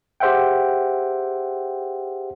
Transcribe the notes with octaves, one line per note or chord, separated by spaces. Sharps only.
G4 G#4 C5 E5 F#5 G5